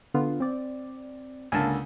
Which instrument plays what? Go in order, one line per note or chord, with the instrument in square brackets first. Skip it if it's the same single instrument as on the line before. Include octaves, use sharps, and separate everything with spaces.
[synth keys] D3 B3 F4
C4 D5
[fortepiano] C#2 D3 A#3 [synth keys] G#5 A5